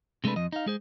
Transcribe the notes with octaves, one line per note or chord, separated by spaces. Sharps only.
C3 G#3 A3 D4 B4
F2 F3 D#5
D#4 F5
G#3 G#4 C5